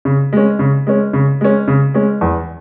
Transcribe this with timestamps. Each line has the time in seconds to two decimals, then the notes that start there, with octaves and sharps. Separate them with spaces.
0.05 C#3
0.33 G#3 C#4
0.59 C#3
0.87 G#3 C#4
1.13 C#3
1.41 G#3 C#4
1.68 C#3
1.94 G#3 C#4
2.21 E2